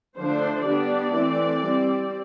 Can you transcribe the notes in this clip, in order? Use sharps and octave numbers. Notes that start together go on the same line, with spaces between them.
D3 F3 A3 D4 C5
G3 B3 D4 D5
E3 A3 C4
G3 C4